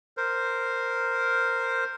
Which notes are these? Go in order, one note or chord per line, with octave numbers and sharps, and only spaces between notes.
A#4 C5